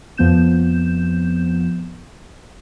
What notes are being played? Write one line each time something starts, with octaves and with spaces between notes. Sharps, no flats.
F2 F3 B3 G6 E7